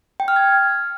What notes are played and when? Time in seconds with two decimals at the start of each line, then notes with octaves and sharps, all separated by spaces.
0.20 G5
0.28 F6
0.36 G#6